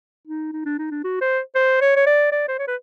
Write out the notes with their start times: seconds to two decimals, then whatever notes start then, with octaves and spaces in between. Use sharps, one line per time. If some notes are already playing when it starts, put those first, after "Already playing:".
0.27 D#4
0.53 D#4
0.65 D4
0.78 D#4
0.91 D4
1.04 F#4
1.21 C5
1.55 C5
1.81 C#5
1.96 C#5
2.07 D5
2.32 D5
2.48 C5
2.59 C#5
2.67 B4